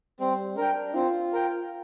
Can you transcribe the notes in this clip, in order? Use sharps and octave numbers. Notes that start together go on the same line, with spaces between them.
G3 C4
D4 A#4 G5
C4 F4
A#4 G5